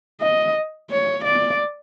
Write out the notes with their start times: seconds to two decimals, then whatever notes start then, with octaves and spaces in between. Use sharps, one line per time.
0.21 D#5
0.91 C#5
1.24 D5